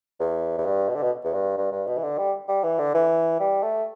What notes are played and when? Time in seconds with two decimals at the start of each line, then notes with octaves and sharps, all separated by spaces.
0.20 E2
0.58 E2
0.65 G2
0.89 B2
0.96 D3
1.03 B2
1.24 E2
1.34 G2
1.57 G2
1.72 G2
1.87 B2
1.97 E3
2.03 D3
2.18 G3
2.49 G3
2.64 E3
2.79 D3
2.94 E3
3.40 G3
3.62 A3